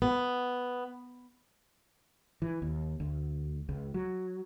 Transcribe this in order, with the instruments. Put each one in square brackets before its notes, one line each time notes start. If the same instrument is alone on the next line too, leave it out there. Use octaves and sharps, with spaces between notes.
[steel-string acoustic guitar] B3
[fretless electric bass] E3
D#2
D2
C#2
F#3